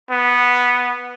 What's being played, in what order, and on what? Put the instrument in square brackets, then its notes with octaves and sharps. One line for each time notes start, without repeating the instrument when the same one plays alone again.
[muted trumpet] B3